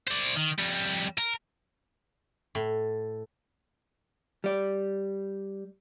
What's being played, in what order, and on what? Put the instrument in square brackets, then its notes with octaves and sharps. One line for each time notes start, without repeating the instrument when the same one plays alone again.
[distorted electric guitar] C5 D5
D#3
F2 G3
A#4
[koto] A2
[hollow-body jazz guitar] G3 D5